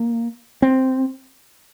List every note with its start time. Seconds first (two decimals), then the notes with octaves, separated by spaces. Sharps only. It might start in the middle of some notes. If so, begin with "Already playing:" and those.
Already playing: A#3
0.62 C4